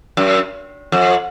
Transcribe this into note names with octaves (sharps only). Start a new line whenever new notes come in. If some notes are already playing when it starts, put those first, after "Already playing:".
F#2
F2